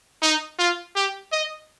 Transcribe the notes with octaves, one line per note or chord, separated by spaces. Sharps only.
D#4
F4
G4
D#5